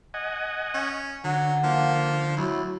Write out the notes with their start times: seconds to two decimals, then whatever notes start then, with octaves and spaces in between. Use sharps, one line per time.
0.14 D#5 F#5 G#5
0.74 C#4
1.24 D3 F#3 F#5
1.64 F3 A#3
2.37 D2 F#3 E4